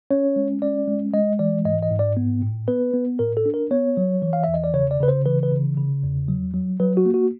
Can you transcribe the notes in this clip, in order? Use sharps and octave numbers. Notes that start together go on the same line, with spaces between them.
C#4 C#5
G#3
C#4 D5
G#3
G#3 D#5
E3 D5
G#2 D#5
D#5
G#2
D5
B3
A2
B3 B4
B3
A2 A#4
A4
D4
A#4
B3 C#5
F#3
E3
F5
E2 E5
D#5
D5
C#3 C#5
D5
C#3 B4
C5
E3 B4
B4
C#3
C#3
E2
F#3
F#3
F#3 B4
F#4
A#3
F#4